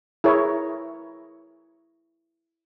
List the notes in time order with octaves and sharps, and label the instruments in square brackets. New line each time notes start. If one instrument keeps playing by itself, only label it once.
[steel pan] E4 G#4 A#4 C#5